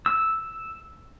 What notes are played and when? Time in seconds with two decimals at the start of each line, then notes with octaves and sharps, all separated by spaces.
0.06 E6